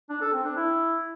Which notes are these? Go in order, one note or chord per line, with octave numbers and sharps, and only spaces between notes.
D4
A4
C4
D4
E4